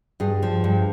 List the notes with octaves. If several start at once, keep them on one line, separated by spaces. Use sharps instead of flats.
G2 G#4
F3
G2